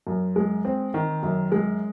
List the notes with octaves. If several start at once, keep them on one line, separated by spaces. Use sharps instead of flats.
F#2
G#3
C4
D#3
F#2
G#3